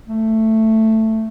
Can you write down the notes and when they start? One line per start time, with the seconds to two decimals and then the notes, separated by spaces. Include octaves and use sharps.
0.08 A3